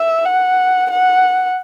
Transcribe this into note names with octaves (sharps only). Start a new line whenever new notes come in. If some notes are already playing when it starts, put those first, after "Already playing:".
Already playing: E5
F#5
F#5